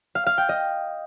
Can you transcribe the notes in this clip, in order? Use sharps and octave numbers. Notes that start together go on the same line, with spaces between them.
F5
F5
G5
D#5